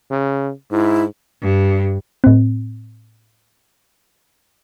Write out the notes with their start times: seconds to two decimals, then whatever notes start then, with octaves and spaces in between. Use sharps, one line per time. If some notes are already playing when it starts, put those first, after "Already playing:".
0.10 C#3
0.71 G#2 E4
1.42 G2
2.24 A2 C4